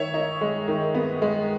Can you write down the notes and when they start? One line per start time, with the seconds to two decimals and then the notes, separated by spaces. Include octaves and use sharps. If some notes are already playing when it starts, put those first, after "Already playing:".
Already playing: D#3 C#5 E5
0.14 D#4
0.41 G#3
0.68 D#3
0.94 B3
1.22 G#3